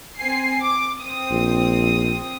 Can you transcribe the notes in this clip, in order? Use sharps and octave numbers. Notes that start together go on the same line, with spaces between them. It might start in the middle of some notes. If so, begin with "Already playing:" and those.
C4 G#5 C7
D6
C4 D#6
A#1